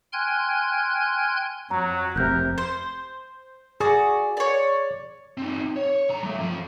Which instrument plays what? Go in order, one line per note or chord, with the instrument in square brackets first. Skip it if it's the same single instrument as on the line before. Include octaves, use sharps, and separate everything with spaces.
[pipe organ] G5 G#5 C6 F6 F#6 G#6
[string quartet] F2 [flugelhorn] F#3 [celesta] A#5
[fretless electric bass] F1 C3 [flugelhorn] A#4 [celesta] F#6 G6
[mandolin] C5
[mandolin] F#4 D5 [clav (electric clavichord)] G#4
[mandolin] C#5 D5
[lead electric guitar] C4 D#4
C#5
D3 A#5
F#3 A3
F2 F3